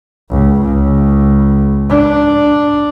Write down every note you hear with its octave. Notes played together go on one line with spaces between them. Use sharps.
C#2
C#2
D4